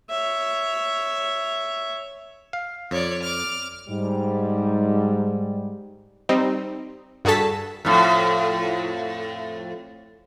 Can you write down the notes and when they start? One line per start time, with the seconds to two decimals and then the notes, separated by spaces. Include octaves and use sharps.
0.10 C#5 E5
2.53 F5
2.91 F2 C#5 D5
3.23 D6 F6
3.89 G#2 G3
6.29 G3 C4 D#4
7.25 G2 F#4 G#4 A4 A5 B6
7.85 F2 A2